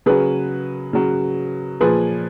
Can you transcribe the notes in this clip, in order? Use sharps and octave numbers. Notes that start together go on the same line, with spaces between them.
C#3 F#3 G#4 B4
C#3 F#3
A#2 F3 G#4 B4